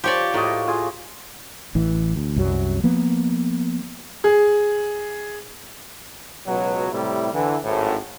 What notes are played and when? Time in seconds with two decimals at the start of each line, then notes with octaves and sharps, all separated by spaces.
0.04 F3 G4 C#5 D5
0.34 A2 A#3 F#4 D#5
0.67 F4 G#4 G#5
1.75 A1 E3
2.16 D2
2.36 C2 F#2 F#3
2.83 F3 A#3 B3
4.24 G#4
6.47 C#2 B2 F#3
6.92 A2 C3 G3 E4
7.34 D3 E3
7.64 G#1 A2